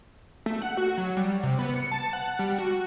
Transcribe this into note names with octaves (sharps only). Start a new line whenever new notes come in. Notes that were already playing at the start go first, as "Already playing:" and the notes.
A3
F#5
F#4
F#3
G3
C3
B3
C#7
A5
F#5
G3
F#4